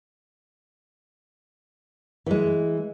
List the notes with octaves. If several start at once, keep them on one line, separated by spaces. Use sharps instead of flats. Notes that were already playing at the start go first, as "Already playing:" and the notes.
E3 G#3